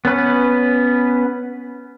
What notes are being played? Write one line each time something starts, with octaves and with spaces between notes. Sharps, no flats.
B3 C#4 B4